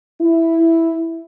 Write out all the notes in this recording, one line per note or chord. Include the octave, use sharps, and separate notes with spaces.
E4